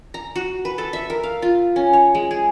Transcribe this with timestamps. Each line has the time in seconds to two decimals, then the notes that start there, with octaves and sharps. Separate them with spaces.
0.14 A#5
0.36 F#4
0.65 B4
0.78 A4
0.93 E5
1.10 A#4
1.23 F5
1.42 F4
1.76 C#4
1.93 C#5
2.15 G#3
2.31 G#4